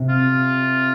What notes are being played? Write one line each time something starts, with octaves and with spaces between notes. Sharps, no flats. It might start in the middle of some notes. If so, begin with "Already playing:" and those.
Already playing: C3
F4